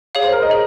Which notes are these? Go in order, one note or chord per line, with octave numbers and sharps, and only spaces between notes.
G#4 C#5 F5
C5
A#4
D#5
G#4